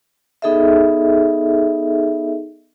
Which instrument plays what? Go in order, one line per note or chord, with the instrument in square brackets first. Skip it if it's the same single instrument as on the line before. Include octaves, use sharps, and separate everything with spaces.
[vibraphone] B3 D#4 G#4 A4 D#5 E5